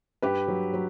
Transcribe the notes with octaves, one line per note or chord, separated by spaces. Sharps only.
G2 G4 B4
F#3
F#3